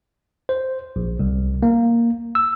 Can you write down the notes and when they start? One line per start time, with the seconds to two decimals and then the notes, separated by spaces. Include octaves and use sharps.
0.49 C5
0.96 A#1
1.19 C2
1.63 A#3
2.35 E6